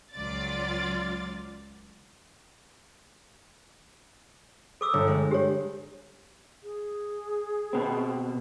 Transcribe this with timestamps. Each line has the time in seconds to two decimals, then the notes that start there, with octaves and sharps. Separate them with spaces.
0.13 C#2 F#3 F4 D5 A6
4.81 A4 D6 E6
4.94 G1 C#5
5.08 G#3
5.31 G4 C#5
6.64 G#4
7.73 B2 C4